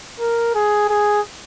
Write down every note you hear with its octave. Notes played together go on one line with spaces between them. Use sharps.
A#4
G#4
G#4